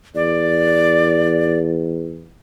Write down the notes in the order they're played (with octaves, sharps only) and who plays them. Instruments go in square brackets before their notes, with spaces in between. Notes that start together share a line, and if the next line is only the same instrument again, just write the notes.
[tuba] E2 [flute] D5